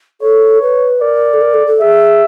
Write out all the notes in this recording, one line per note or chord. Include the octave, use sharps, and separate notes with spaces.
A4 C#5
B4
A#4 D5
A4
A#4
A4
A4
G#4 E5